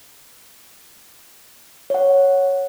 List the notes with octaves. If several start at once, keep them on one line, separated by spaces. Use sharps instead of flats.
C#5 F#5